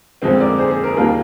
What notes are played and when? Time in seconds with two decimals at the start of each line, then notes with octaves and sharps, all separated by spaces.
0.22 F2 D3 G#3 C4
0.40 A#4 D5
0.59 G#4 C5
0.71 G#4
0.84 A#4
0.91 G#4
0.97 D#2 D#3 G3 A#3 F4 A#4